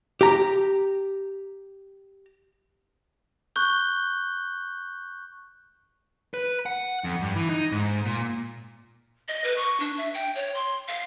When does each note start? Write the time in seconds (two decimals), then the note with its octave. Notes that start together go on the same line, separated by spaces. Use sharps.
0.21 G4 A#5
3.56 C#6 F#6 G6 G7
6.34 B4
6.66 F#5
7.04 F2
7.21 G2
7.36 E3
7.49 D#4
7.72 G#2
8.06 A#2
9.28 D#5
9.44 B4
9.57 C#6
9.80 D4
9.98 E5
10.14 G5
10.35 C#5
10.55 C6
10.88 F5